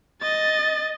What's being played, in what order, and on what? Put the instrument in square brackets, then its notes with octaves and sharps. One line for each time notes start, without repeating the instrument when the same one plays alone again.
[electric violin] D#5 A6